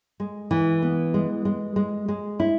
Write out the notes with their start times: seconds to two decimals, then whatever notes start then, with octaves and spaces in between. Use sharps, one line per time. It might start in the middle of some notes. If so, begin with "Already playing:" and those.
0.20 G#3
0.51 E3
0.82 B3
1.14 G#3
1.45 G#3
1.76 G#3
2.08 G#3
2.40 E4